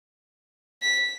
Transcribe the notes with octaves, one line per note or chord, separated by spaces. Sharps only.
B6